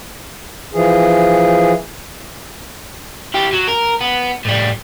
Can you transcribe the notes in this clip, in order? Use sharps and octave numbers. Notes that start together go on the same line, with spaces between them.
E3 F3 G#4
E4 G4
F#3
A#4
B3
A2 G3